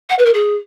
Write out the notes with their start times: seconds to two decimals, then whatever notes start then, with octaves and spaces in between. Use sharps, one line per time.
0.09 F#5
0.18 B4
0.25 A#4
0.34 G#4